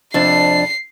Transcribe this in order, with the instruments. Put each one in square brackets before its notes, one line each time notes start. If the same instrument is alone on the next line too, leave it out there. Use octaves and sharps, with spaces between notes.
[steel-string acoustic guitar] F2 C3 D4 [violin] C7